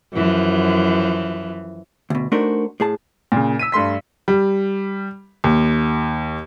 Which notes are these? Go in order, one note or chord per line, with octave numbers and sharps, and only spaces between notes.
F#2 E3 F3
D2 B2
A3 D4 D#4 F#4 A#4 C5
A2 G#4 A5
A#2 C#3
E6 B6 D#7
G2 A3 C6 B6
G3
D#2